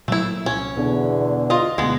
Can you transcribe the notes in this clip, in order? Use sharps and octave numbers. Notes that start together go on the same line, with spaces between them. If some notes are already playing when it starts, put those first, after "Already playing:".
A#2 F#3 A3 A#3 E4
C2 C#4
E2 B2 D3
F4 D#5
D2 B2 G#3 B3